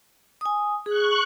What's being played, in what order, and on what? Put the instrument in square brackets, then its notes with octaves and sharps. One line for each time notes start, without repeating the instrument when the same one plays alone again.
[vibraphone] G#5 D#6
[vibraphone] G#4 [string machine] C#6 F#6